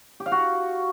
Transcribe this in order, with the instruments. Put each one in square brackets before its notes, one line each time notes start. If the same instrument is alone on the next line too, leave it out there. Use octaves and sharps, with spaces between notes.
[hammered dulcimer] G4
F5
F#4